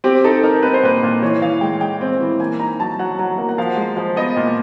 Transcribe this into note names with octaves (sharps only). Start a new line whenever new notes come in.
C4 G4
D#4 A4
D#4 A#4
C4 B4
C5
A#2 B4
A#2
E3 C#5
E3 F5
G#3 G5
G#3 G5
C4
E3
A#3 G#5
D#4 A#5
F#3 A5
F#3 F#5
F#3
A#3
F#5
F3 F5
G#3
F3
B3 D#5
A#2